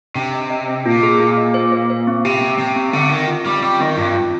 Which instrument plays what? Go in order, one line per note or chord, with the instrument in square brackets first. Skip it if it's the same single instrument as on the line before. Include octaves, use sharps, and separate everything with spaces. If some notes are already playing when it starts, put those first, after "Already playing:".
[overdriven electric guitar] C3 [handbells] D4
[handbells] D#5
D#5
D#5
[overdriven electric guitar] A#2 [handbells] F4
[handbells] G#4
F4
D#5
C5
C5
C5
C4
[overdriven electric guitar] C3 [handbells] G4
[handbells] C4
[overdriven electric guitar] C3 [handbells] C4
[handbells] C4
[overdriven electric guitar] D3 [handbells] C4
[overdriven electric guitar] D#3 [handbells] C4
[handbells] F4
[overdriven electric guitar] G3 [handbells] C4
[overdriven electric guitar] G3 [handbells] C4
[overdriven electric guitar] D#3 [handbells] C4
[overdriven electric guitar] G2 [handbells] F4
[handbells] F4